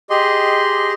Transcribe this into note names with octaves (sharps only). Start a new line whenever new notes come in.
G4 G#4 D#5 C6